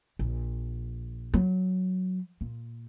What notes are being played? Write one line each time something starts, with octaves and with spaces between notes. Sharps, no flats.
A#1
F#3
A#2